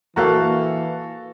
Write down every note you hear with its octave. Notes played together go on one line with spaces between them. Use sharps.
E3 A#3 F#4 A4 F5 F#5 A#5